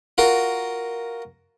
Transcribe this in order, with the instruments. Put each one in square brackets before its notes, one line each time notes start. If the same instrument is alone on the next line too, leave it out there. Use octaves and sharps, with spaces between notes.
[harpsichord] F4 F#4 A#4